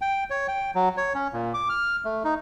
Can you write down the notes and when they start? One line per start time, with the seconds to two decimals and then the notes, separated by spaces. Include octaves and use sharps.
0.01 G5
0.30 C#5
0.48 G5
0.75 F#3
0.97 C#5
1.15 C#4
1.33 A#2
1.54 D6
1.69 F6
2.05 A3
2.24 D#4